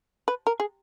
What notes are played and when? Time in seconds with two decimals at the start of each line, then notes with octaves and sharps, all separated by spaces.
0.28 B4
0.47 A#4
0.60 G#4